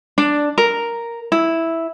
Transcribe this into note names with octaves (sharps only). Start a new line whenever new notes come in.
D4
A#4
E4